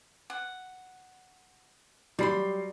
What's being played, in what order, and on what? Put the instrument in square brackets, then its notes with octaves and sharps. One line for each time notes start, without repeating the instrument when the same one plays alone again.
[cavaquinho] F#5
[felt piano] F#3 C7 [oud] G3 [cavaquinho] D5 B5 C6